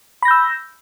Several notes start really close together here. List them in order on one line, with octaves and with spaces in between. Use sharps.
B5 A#6 G6 E6